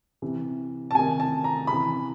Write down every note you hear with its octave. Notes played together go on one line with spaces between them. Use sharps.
C3 E3
A5
C3 D#3 G#5
A5
A#5
C3 E3 B5